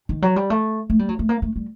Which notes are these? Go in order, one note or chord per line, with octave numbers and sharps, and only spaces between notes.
D#3
F#3
G3
A3
A3
G3
F#3
A3
A#3
A3
G3